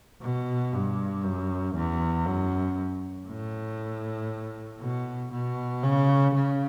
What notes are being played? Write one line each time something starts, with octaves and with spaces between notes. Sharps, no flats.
B2
G2
F#2
E2
F#2
A2
B2
B2
C#3
C#3